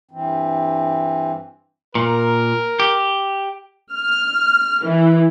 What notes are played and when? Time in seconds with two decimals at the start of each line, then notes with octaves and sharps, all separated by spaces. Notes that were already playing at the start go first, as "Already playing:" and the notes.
0.11 G2 E3 C4
1.95 A#2 A#4
2.80 G4
3.91 F6
4.83 E3